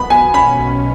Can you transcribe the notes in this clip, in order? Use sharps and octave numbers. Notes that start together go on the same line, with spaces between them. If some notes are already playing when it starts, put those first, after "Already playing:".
Already playing: B1 B3 B5
B2 G#5
C#4 B5
B1